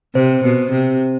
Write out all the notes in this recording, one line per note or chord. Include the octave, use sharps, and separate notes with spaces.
C3 C5
B2
C3